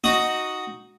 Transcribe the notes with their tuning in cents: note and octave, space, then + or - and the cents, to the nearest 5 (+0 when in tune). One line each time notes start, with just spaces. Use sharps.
D#4 +0 F#4 +0 D#6 +0